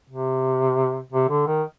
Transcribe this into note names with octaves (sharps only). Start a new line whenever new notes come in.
C3
C3
D3
D#3